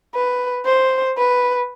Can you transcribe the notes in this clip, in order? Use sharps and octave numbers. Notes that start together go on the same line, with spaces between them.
B4
C5
B4